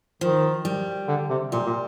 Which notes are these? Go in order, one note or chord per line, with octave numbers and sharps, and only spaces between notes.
D#3 F3
G3
D3
C3
A#2 G3
A#2